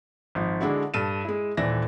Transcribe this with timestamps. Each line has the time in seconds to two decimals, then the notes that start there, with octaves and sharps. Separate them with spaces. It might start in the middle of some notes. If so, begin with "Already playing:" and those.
0.35 G#1 F3
0.61 D3 G#3 D4 E4 F#4
0.94 G2 A4 D#7 E7
1.25 G#3 E4
1.57 D#1 E3 D5 E5 A#6